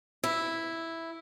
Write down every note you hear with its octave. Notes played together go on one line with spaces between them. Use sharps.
E4